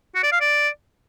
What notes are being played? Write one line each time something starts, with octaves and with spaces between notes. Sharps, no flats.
F#4
D5
F5
D5